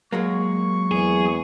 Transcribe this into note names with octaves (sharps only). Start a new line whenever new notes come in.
F#3 G#3 A#3 C#6
E2 G#4